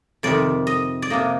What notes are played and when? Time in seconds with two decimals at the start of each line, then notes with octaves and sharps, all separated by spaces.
0.23 F2 C3 D#3 D5
0.67 D#5
1.02 D5
1.10 C3 F3 A#3 D#5